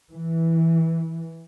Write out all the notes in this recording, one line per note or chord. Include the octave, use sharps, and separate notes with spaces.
E3